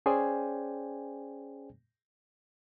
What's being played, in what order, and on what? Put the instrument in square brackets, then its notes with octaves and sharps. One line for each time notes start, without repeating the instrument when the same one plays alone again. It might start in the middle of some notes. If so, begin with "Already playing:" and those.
[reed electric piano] C#4 G#4 C5 D5 G5 G#5